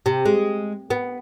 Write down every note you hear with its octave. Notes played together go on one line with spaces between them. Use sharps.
C3
G#3
B3